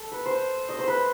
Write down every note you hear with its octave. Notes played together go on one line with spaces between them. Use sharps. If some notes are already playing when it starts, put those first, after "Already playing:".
Already playing: A4
B4
C5
D#5
C5
B4